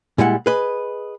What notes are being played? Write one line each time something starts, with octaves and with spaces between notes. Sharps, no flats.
A#2 G3 G#3 E4 F#5
G#4 B4 D#5